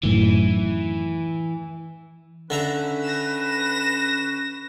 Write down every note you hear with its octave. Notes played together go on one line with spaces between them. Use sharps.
F#2 A2 D#3 E3
D3 C#4 E4 B4 A#5
A#6 E7